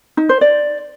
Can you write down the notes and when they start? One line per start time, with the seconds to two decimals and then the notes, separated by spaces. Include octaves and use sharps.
0.17 D#4
0.29 C5
0.41 D5